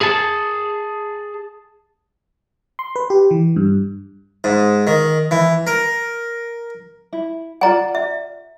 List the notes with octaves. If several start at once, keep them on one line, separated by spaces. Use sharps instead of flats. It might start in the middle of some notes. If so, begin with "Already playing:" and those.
G#4 A5
C6
B4
G4
E3
G2
G#2
D#3
E3
A#4
E4
F4 D5 F#5 G#5 A#5
E5